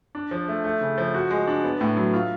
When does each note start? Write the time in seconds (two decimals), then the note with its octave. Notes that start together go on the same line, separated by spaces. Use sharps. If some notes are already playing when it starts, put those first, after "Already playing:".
0.15 D4
0.31 F3
0.48 A3
0.64 A3
0.81 C#3
0.98 F3
1.15 F#4
1.31 G#3
1.47 D4
1.64 B3
1.81 A2
1.97 F#3
2.14 F4